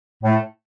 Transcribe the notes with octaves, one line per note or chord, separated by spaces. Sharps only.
A2 A3